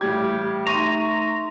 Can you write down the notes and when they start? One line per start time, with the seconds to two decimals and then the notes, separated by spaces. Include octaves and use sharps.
0.01 A1 G3 G4 G#6
0.67 A3 D#4 A#5 C6 C#6 A#6 D#7